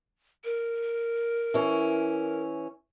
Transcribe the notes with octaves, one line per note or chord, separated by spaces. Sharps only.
A#4
E3 C#4